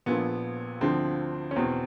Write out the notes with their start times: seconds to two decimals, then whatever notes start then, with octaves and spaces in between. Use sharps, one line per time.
0.06 A#1 A#2 F3 B3
0.81 D2 D3 F3 C4
1.51 C#4
1.56 E2 B2 C4